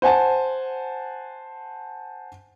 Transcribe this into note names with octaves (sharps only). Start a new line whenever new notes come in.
C5 F#5 G#5 A5